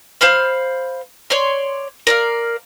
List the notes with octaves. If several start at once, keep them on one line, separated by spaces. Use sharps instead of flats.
C5 F5 B5 F6
C#5 D5 C6
A#4 D5 F5